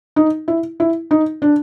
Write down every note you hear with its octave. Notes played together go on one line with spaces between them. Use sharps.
D#4
E4
E4
D#4
D4